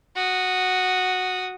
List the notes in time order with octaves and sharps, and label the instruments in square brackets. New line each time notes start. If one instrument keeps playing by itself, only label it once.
[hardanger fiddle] F#4 D#6